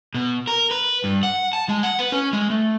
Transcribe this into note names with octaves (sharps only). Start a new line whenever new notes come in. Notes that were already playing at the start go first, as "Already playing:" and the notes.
B2
A#4
B4
G2
F#5
A5
G#3
F#5
B4
C#4
G#3
A3